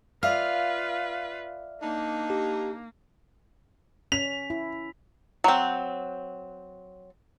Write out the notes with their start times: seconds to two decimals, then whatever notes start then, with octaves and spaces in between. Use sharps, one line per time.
0.23 F4 B4 D5 E5 F5 F6
1.81 A#3 D4 D#4
2.30 G4
4.12 C#4 B6 F7
4.50 E4
5.44 F#3 C4